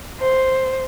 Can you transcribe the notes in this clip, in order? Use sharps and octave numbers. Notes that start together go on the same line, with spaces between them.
C5